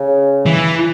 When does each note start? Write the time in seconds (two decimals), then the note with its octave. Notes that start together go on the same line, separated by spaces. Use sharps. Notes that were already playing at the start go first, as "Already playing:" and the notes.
Already playing: C#3
0.46 E3